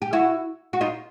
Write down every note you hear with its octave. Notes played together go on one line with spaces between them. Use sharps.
G4
E4 F#4
F#4
D#4 F4